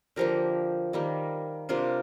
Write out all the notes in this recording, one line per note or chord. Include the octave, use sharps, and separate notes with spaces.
D3 F3 A#3 G4 A#4
D#3 G3 A#3
C3 G3 A#3 D4 F4